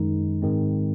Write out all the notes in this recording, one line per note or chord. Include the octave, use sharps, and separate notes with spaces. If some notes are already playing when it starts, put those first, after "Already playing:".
Already playing: F#2 D#3 G#3 D#4
G#2 D#3 G#3 C4